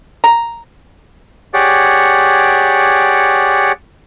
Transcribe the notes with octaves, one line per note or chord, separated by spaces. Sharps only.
A#5
G4 G#4 C#5 D5 F#5